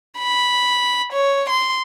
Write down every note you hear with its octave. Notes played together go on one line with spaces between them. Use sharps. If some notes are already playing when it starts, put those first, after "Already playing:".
B5
C#5
C6